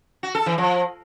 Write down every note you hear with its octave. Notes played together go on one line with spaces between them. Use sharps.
F#4
A4
E3
F3